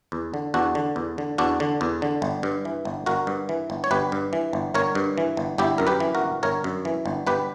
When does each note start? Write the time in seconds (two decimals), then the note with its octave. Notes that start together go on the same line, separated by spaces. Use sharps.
0.12 E2
0.34 D3
0.54 E2 D4 F#4
0.75 D3
0.96 E2
1.18 D3
1.38 E2 D4 F#4
1.60 D3
1.81 E2
2.02 D3
2.22 G1
2.43 G2
2.65 E3
2.85 G1
3.06 G1 F#4 A#4
3.27 G2
3.49 E3
3.70 G1
3.84 C#5
3.91 G1 G4 B4
4.12 G2
4.33 E3
4.53 G1
4.74 G1 A#4 C#5
4.95 G2
5.18 E3
5.37 G1
5.58 G1 E4 G4
5.78 F#2 A#4
5.87 G4 B4
6.00 E3
6.15 F#4 A#4
6.21 G1
6.43 G1 A#4 C#5
6.64 F#2
6.85 E3
7.06 G1
7.27 G1 G4 B4